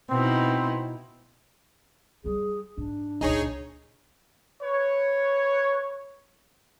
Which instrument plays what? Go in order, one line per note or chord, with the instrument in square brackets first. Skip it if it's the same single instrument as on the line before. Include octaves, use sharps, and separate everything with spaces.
[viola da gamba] B2 D#4 E4 [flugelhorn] C4
[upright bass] G3 F4 [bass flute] G#4
[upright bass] G#2 [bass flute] D4
[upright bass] C#2 A#2 [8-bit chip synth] D#4 G#4 C#5
[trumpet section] B4 C#5